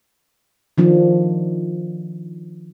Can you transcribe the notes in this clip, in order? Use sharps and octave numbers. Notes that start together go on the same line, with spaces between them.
D#3 F3 D4